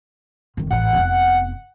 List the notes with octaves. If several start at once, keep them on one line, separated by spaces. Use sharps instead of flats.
F1 D#3
A1 G#2 F#5
F1 B3